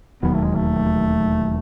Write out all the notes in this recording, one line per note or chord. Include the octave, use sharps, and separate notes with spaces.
E1 D#2 D#3 F#3 B3
A3
G#3
A3